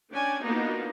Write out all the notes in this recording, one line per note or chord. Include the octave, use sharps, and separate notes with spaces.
C#4 D4 D5 G5 G#5
A#3 B3 D4 D#4 F4 F#4